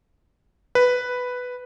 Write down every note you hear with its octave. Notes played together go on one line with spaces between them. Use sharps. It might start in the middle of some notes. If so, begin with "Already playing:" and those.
B4